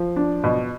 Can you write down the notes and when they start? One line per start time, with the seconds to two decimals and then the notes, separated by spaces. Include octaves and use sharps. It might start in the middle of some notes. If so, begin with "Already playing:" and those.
Already playing: F3
0.16 D4
0.44 B2